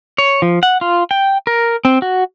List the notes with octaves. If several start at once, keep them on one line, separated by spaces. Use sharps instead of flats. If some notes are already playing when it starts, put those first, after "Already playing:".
C#5
F3
F#5
F4
G5
A#4
C4
F#4